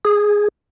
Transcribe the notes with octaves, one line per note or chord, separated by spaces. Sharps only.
G#4